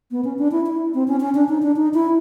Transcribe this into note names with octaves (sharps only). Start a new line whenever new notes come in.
B3
C#4
D4
E4
E4
C4
C#4
C#4
D4
D#4
D4
D#4
E4